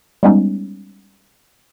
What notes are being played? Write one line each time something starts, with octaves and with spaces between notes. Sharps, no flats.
G3 G#3 B3 C#4 D#4